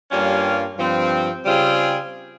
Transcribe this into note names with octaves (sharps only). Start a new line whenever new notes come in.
G2 G3 A#3 C#4 F4
G2 F3 C4
C#3 G3 C4 F4 G#4